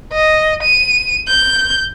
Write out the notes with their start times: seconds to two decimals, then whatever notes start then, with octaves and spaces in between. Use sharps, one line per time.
0.12 D#5
0.63 D#7
1.28 G6